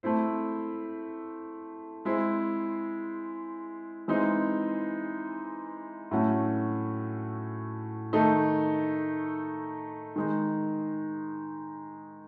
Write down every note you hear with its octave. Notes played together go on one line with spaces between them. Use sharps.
A3 C4 E4 C5
G#3 C4 E4 C5
E3 G#3 C4 D#4
A2 F#3 A3 C#4 F#4
D#3 A3 D#4 A4
D#3 G#3 D#4